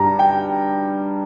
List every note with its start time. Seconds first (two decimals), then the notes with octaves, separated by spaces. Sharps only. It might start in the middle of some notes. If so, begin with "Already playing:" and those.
Already playing: G2 G3 A#5
0.19 G5